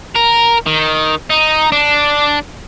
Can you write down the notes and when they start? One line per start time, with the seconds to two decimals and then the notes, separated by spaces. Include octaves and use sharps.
0.15 A#4
0.66 D#3
1.30 D#4
1.72 D4